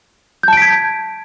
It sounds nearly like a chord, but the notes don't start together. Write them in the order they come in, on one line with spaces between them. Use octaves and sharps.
G6 A5 D7 B6 G#6